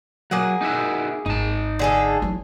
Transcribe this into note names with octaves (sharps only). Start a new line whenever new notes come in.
F#3 A#3 G#4 F#5
D#4 F#4 E5
G#1 D#4 A5
D3 G#4 A4
E3 F#3